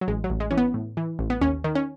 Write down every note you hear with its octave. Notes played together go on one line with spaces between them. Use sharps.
F#3
A1 G#3
F#3
A1
G#3
E3 C#4
B3
A2
E3
A1
B3
D#2 C#4
D#3
C#4